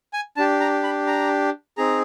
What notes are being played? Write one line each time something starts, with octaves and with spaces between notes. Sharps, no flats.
G#5
D4 G4 A5
A#5
B5
A#5
C4 D#4 G#4 A#5